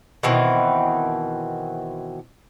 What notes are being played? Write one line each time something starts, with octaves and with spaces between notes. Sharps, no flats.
B2 D#3 E3 C4